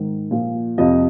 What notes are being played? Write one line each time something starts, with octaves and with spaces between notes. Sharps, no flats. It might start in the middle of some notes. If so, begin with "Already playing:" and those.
Already playing: G#2 D#3
A#2 F3
F2 C3 F3 D#5